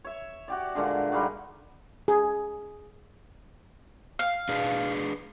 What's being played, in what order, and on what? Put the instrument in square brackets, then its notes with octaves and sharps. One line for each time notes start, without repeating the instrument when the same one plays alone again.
[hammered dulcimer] C#5 E5
F#4 G4 D5
A#2 D3 G#3 D4
G3 G#3 D#4 F#4
[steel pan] G#4
[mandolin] F5
[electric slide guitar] D4 G#4 B4